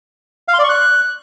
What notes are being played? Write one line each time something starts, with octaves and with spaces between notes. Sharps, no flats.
F5
C6
D5
C#6
F#6